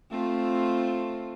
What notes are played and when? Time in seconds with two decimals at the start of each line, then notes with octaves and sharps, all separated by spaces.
0.11 A3 C4 F4